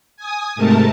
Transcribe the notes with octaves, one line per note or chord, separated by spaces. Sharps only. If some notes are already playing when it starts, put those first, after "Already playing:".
G#5 D#6
G#2 C3 A3 A#4 A5